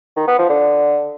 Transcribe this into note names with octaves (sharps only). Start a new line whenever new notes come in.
D#3
B3
F3
D3